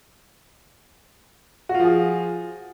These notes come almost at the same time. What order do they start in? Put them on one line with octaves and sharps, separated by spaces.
F#4 F4 F3 G#4